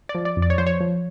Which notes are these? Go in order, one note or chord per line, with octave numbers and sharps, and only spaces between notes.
D5
F3
D5
F2
D5
C#5
F3 C5
C#5
F3